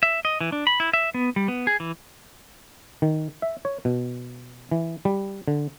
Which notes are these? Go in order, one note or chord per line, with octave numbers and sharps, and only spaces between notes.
E5
D#5
E3
D4
B5
E4
E5
B3
G3
B3
G#4
E3
D#3
E5
C#5
B2
E3
G3
D3